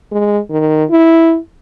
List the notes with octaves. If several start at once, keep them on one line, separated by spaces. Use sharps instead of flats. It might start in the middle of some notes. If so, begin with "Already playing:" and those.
G#3
D#3
E4